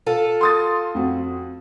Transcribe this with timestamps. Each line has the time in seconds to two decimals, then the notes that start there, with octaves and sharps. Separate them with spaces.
0.06 F4 A4
0.41 C6 D#6 A6
0.95 F2 F#4